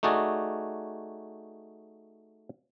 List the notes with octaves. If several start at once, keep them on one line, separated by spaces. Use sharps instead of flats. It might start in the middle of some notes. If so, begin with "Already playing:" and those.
A3 D#4 F#4 G#4 D5